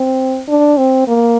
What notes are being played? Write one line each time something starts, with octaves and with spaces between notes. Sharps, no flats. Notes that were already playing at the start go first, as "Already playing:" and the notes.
Already playing: C4
D4
C4
A#3